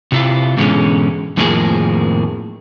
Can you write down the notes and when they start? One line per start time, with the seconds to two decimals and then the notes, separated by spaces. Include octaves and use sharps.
0.12 C3 E4 F4
0.57 G#2 B2 D3 E3 G#3 C#4
1.37 F2 A2 D#3 F3 A#3 G#4